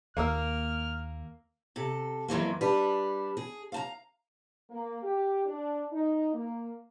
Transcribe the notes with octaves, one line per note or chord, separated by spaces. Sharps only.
D#2 A#3 A#4 E6 F6
C3 A4
F2 E3 F#3 A#3
G3 D4 B4
G#4
F5 A5 A#5
A#3
G4
D4
D#4
A#3